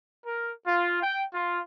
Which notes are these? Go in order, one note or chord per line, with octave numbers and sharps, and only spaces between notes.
A#4
F4
G5
F4